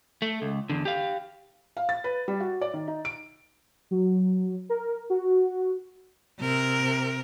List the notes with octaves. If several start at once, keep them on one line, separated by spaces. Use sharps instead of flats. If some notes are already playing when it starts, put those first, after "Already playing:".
A3
C#2
E2 D3
G4 F5
F5
A6
B4
G3
F#4
D5
D#3
D#4
D7
F#3
A#4
F#4
C3 A#4